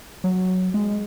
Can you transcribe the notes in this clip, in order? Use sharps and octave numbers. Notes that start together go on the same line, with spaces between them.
F#3
G#3